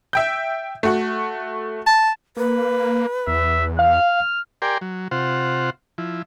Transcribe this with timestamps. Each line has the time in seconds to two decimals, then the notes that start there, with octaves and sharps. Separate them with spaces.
0.13 E5 G5 G6
0.83 A3 F#4
1.87 A5
2.37 A#3 B4
3.27 E2 E5
3.79 F5 F6
4.62 G4 A#4 D5 G5 G#5 C6
4.81 F#3
5.11 C3 F4 C5 F#5
5.98 F3 E4